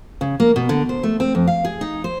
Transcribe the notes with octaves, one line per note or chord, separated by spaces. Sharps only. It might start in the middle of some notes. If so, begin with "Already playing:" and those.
C#3
A#3
B2
D3
C5
A3
C4
F2
F5
G#4
D#4
C5